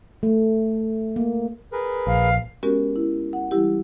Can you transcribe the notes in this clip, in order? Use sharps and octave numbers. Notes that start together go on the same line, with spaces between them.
A3
A#3
G#4 A#4 B4
A#1 F5
G#3 B3 C#4 F#4 G4 A#4
E4
F#5
E3 G3 E4 G4